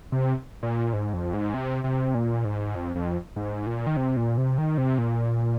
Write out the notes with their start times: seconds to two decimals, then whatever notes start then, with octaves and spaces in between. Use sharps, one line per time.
0.12 C3
0.63 A#2
0.93 G#2
1.13 F2
1.34 G#2
1.54 C3
1.84 C3
2.14 A#2
2.45 G#2
2.75 F2
2.96 F2
3.36 G#2
3.66 A#2
3.87 D#3
3.97 C3
4.17 A#2
4.37 C3
4.58 D#3
4.78 C3
4.98 A#2